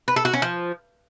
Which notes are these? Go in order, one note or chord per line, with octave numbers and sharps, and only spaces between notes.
B4
A4
F#4
C#4
F3